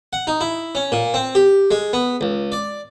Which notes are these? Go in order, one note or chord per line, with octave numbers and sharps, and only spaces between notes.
F#5
D#4
E4
C#4
A#2
C4
G4
G#3
B3
C#2
D5